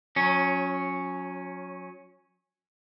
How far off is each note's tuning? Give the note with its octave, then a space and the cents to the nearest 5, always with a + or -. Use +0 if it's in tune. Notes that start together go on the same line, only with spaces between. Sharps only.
F#3 -30 C#4 +0